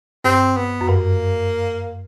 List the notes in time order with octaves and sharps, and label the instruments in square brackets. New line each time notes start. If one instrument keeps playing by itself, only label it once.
[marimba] G2 [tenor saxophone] C4
[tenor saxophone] B3
[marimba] F#2
[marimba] G2 [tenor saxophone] A#3